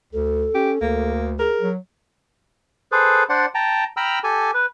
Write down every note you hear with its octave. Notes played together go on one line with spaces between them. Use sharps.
D2 A4
C#4 G4
D2 A#3
G#4 A#4
F#3
G#4 A4 B4 C5
D4 C5 D5 F#5
G5 A5 A#5
G5 A#5 B5 E6 F6
G4 A4 G#5
B4